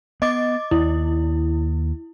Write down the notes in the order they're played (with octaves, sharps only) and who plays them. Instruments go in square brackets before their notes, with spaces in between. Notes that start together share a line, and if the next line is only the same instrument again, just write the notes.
[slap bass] B3 [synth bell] D#5 D6 A6
[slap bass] D#2 [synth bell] E4